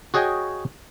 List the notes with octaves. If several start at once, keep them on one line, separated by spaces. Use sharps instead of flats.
F#4 G#4 C#5 D#5 G5 G#5